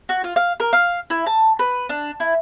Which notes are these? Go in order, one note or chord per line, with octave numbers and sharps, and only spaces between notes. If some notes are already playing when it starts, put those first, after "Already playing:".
F#4
F4
F5
A#4
F5
E4
A5
B4
D4
E4